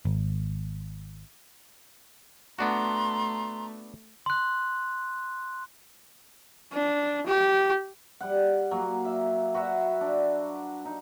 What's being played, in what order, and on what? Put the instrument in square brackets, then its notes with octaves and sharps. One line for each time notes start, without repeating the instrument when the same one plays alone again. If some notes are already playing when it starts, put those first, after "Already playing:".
[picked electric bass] G#1
[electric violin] A3 [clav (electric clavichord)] B3 D4 F#4 [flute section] A#5 C6
[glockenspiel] C6 F#6
[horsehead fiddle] D4
G4
[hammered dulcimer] G3 F#5
F#3 A#3
E5
F#4 B4 E5 F#5
D4
D#4